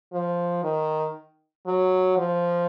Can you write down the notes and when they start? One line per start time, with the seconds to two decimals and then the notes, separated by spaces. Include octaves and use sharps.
0.13 F3
0.64 D#3
1.66 F#3
2.18 F3